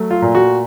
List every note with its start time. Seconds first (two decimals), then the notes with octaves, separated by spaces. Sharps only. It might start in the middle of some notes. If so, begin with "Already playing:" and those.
Already playing: F#3 A3
0.11 F4
0.22 A#2
0.35 F#4